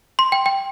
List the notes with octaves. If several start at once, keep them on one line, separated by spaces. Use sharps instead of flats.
C6
G5
G5